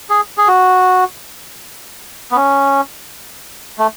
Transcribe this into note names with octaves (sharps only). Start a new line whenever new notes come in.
G#4
G#4
F#4
B3
C#4
A3